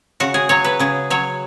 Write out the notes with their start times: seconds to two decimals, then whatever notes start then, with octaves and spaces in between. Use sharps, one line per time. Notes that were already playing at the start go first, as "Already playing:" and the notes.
0.20 C#3 F#4
0.34 G#4
0.49 F#3 C#5
0.64 B4
0.79 C#3 G#4
1.10 F#3 C#5